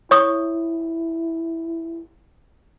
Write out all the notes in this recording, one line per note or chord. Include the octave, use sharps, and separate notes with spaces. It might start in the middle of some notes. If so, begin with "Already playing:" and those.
E4 C#5 C#6 D#6